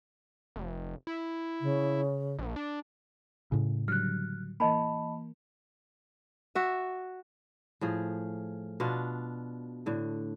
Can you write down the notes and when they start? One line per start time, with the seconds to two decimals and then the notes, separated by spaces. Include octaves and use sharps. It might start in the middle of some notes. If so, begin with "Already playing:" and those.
0.56 F1
1.07 E4
1.61 C#3
2.39 A#1
2.56 D4
3.52 A2 C#3
3.88 D3 F#3 G3 F6 F#6
4.60 E3 A#3 D#5 A5 B5
6.55 F#4 E5
7.81 A2 F3 G#4
8.80 B2 D4 F4 F#5
9.86 A2 D3